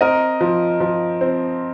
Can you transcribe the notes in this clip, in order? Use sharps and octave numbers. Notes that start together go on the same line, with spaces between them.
C4 A#4 D#5
F3
F3
C4